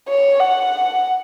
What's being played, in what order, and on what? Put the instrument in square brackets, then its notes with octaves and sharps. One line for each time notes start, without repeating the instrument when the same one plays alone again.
[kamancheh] C#5
F#5